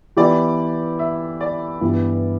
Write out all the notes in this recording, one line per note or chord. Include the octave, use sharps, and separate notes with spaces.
E3 B3 E4 G4 D5
E5
D5
G2 E3 G3 B3